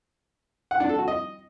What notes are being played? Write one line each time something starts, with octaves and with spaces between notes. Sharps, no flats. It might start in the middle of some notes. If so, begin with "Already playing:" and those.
F#5
D4
A4
F#4
D#5